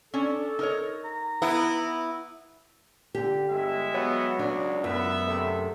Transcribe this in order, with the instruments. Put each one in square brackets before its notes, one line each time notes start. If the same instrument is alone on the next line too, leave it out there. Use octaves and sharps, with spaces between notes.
[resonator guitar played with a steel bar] C#4 D4 [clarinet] A4
[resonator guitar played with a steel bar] D#4 A#4 C#5
[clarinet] A#5
[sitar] B3 E4
[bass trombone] D3 [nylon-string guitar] G4
[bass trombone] G1 [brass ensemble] G#3 E5
[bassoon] F#3 [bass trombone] B3
[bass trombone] C#2 [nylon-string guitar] D4
[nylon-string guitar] F#2 [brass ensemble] B3 E5
[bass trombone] C3 [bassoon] A3